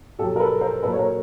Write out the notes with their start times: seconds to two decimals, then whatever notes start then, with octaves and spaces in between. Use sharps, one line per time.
0.19 B2 F#3 G4 A4
0.36 A#4
0.40 A4 B4
0.61 A#4 C5
0.83 A#2 F#3 A4 B4
0.92 C#5
0.99 A#4 C5